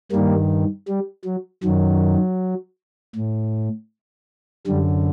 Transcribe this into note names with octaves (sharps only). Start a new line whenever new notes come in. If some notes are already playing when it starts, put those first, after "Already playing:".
G2 D#3 G3 A#3
G3
F#3
F#2 D#3 F#3
A2
F#2 D3 G3